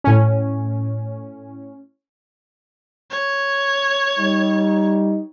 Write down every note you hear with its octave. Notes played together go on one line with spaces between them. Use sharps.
A2 C#4
C#5
G3 D#4